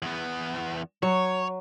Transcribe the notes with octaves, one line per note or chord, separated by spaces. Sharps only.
E2 B3
F#3 C#5